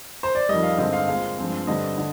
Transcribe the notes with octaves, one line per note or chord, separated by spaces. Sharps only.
C5
D5
F2 D#3 G3 D#5
F5
G2 D3 G#3 C4 D#5
F5
A#2 G#3 C4 F5
G2 F3 G#3 C4
G2 D3 G3 C4 D#5
D3